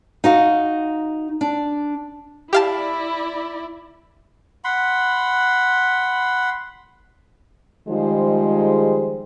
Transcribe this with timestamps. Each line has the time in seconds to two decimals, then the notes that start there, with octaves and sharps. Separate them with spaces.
0.24 D#4 F#4 F5
1.41 D4
2.53 E4 G4 D5 F5 A5
4.64 F#5 B5 C6
7.89 D#3 F3 G3 G#3 G#4 C5